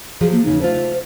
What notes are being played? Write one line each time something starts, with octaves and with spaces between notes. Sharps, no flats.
F3 F#3 G#4
A#3
E2 C#3 D#4
A3 F4 C5